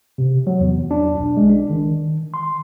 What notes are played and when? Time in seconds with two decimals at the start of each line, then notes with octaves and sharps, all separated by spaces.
0.18 C3
0.47 F#3
0.60 E2
0.91 D4
1.17 B1
1.37 G#3
1.49 D4
1.70 D#3
2.34 C6